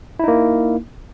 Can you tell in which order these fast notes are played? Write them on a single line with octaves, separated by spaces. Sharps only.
E4 D#4 A#3